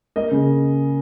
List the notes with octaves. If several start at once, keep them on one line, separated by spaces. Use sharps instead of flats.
A#3 D#5
C#3